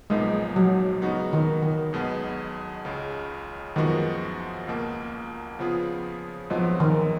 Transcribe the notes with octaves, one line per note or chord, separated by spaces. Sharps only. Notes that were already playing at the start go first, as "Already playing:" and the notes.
B1 A#2 F3 G#3 B3 D#4
F#3
C#3 G#3 B3 D#4 F#4
D#3
D#3
B1 B2 G#3 B3
C#2 C#3 G#3
F#2 D#3 F3 G#3 B3 F#4
C#2 B2 A#3
C#3 F3 B3 F4 G#4
G#1 G#2 F3 F#3 B3
D#3